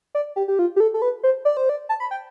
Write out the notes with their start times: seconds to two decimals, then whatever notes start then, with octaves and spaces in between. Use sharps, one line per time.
0.15 D5
0.36 G4
0.48 G4
0.59 F4
0.76 G4
0.80 A4
0.94 A4
1.02 B4
1.23 C5
1.45 D5
1.57 C5
1.69 D5
1.89 A5
2.00 B5
2.11 G5